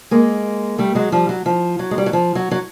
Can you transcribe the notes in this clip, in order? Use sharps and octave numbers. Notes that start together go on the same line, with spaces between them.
G#3 A#3
G3 A3
F#3 G#3
F3 G3
F#3
F3
F#3
G#3
G3
F#3
F3
F#3
F#3